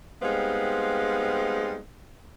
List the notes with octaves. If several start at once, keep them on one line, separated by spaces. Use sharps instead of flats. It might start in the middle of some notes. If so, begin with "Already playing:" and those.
G3 G#3 B3 C4 D#4 F5